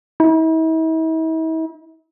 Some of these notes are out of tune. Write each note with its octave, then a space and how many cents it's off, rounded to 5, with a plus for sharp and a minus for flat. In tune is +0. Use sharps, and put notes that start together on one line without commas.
E4 -45